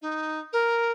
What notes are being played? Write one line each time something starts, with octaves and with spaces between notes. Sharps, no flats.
D#4
A#4